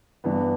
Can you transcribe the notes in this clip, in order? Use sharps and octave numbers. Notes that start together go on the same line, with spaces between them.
G2 E3 B3 D4